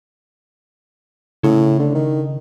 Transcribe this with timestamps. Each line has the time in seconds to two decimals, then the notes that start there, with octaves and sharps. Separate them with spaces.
1.43 A2 C#3
1.79 D3
1.94 D#3